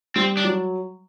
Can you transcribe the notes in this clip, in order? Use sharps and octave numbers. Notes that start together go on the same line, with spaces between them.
G3 C4
D4
F#3